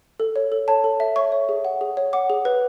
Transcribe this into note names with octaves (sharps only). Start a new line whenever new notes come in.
A4
C#5
A4
C#5 A5
A4
E5
C#5 C#6
C#5
G#4
F#5
G#4
C#5
F#5 D6
G#4
B4